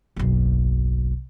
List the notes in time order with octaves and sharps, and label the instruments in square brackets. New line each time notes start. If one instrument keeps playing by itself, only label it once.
[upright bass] F#1 B1